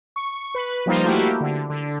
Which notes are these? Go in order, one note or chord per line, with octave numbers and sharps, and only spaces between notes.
C#6
B4
F3 G3 A#3 D#4 F4 C5
A3 A#3 E4 F#4 G4
D3
D3